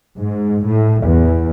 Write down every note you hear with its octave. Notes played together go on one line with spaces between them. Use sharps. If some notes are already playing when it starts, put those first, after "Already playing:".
G#2
A2
E2